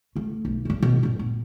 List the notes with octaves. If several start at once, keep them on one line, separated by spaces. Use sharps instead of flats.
C#2 A3
B1
G2 G#3
B2 D#3
G2 A#2
B3